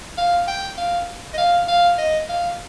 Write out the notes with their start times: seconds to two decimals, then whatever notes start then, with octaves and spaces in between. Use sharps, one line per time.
0.17 F5
0.47 G5
0.77 F5
1.33 D#5
1.38 F5
1.68 F5
1.98 D#5
2.29 F5